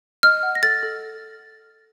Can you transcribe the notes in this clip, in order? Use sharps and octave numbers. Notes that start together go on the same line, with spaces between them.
D#5 F6
F#5
A#6
A4 A6
A4